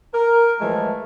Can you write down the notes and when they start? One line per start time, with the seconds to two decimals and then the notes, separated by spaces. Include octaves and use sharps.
0.14 A#4
0.60 A2 E3 F3 G#3 A3